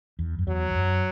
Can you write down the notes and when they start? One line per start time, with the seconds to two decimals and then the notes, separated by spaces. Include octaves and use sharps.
0.19 E2
0.39 F#2
0.47 E2 F#3
0.71 E2
0.75 F#2